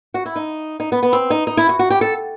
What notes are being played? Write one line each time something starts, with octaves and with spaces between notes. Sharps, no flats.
F#4
E4
D#4
D#4
B3
B3
C4
D#4
D#4
E4
F#4
F#4
G4
A4